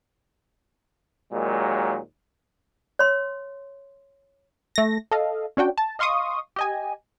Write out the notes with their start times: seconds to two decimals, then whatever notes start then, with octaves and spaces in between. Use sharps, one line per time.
1.33 D#2 A#2 F#3 G#3
2.99 C#5 C6
4.76 A3 A#6
5.11 A4 D#5 F5
5.57 C#4 D4 F#4 G5
5.78 A5
5.99 D#5 F5 C6 C#6 D#6
6.56 G4 D#5 G#5